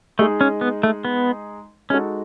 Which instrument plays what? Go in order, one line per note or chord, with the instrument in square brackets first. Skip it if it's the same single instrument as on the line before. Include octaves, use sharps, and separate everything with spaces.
[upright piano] G#3 D#4 G#4 D#5 [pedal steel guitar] A3
[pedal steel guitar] C#4
B3
A3
B3
[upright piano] G#3 D#4 F#4 A4 [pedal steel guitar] C#4